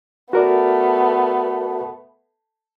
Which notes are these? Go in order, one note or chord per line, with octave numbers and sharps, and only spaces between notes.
A3 B3 F#4 A#4 D5